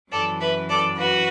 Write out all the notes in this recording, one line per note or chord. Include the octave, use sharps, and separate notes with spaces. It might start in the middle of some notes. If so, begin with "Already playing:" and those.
F#2 E3 A4 D5
B4 E5
A4 D5
F#4 B4